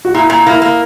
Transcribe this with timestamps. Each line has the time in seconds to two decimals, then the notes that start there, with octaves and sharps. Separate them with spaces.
0.05 F#4
0.14 A#2 E4
0.30 A#2
0.46 A#3 E4
0.62 A#3